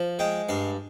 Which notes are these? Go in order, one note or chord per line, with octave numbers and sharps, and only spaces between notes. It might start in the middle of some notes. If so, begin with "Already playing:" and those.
Already playing: F3
G#3 G5
G2 F5